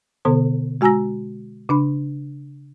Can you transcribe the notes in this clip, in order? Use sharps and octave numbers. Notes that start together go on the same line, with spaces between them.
B2 D3 B3 A4 C5
G#3 F#4 G#5 A#5 E6 A#6
C#3 D4 B5